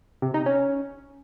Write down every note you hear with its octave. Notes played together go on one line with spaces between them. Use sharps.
C3
D#4
C#4